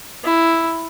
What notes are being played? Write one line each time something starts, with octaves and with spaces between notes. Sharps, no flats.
E4